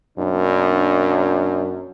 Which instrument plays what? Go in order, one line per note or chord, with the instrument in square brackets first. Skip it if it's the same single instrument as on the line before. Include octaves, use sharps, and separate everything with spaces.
[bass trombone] F#2 [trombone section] B2 A#3 D4